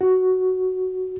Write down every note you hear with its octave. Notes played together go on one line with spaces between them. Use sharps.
F#4